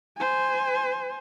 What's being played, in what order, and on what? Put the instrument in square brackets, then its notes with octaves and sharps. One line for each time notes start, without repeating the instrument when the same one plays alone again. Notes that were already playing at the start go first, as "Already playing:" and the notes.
[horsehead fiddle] C5 G#5